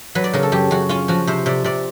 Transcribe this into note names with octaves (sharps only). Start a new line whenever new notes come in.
F#3 B4
D5
C#3 A#4
A4
F#2 G4
F#2 F#4
C#4 F4
F3 F#4
C3 C5
C3 D5
C3 D5